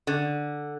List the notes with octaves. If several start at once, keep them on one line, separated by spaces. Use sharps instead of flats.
D3